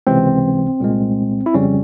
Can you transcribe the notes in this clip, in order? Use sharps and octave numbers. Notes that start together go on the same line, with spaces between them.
C#2 C3 E3 C4
C2 A#2 G#3
E4
F2 C#3 G3 C#4